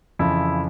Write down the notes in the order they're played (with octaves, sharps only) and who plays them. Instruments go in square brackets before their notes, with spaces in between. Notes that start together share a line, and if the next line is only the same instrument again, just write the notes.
[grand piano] F2 C#3 E3 E4